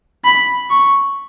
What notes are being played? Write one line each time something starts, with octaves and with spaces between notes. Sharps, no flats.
B5
C#6